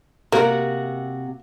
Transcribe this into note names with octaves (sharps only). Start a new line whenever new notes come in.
C3 A#3 F#4 F#5